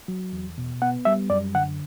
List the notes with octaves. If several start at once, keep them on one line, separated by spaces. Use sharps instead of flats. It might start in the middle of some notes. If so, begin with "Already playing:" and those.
F#3
E2
B2
B3 F#5
G3 E5
F#2 D5
D3 F#5